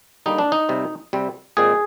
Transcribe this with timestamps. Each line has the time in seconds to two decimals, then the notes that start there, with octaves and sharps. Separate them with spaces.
0.26 D3 G3 A#3 D#4
0.38 D4
0.52 D#4
0.69 C3 G3 C4
1.13 C3 G3 C4
1.57 A#2 G#3 C4 G#4